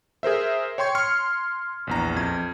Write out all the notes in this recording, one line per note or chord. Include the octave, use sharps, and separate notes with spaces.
G#4 A#4 C5 E5
C#5 G5 C6 C#6 G#6
C6 F6 C#7
A#1 E2 A#5
F2 G#6